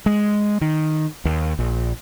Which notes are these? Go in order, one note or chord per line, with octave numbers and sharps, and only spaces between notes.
G#3
D#3
D#2
A#1